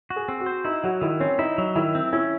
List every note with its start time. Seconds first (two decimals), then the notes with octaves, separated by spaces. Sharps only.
0.10 F#4
0.16 G#4
0.28 C4
0.40 F#4
0.46 C5
0.65 D#4 E4
0.84 F#3 F#4
1.01 D#3 E4
1.20 C4 C#4
1.39 D#4 E4
1.58 F#3
1.76 D#3 E4
1.95 C4
2.13 C#4 E4